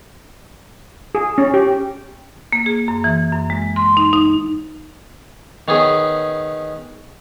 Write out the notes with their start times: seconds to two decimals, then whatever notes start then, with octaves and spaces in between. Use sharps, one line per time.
1.15 G#4
1.38 C#4
1.54 G4
2.52 A#3
2.66 G#4
2.88 F#2
3.04 E3
3.32 F#2
3.50 G#3
3.76 C6
3.97 D#4
4.13 D#4
5.68 D#3 B3 C#4 G#4